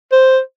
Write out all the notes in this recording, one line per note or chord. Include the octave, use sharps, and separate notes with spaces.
C5